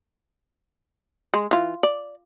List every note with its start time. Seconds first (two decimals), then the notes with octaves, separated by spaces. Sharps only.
1.34 G#3
1.51 E3 F4
1.83 D5